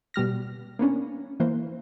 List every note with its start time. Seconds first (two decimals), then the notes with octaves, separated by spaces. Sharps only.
0.14 B2 G3 F6 A#6
0.79 A#3 B3 C#4 D4
1.40 E3 A#3 C5